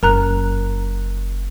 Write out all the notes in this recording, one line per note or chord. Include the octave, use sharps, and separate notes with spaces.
F#1 A#4 A#5 F#6